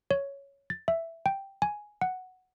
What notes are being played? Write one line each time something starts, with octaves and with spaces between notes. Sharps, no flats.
C#5
A6
E5
G5
G#5
F#5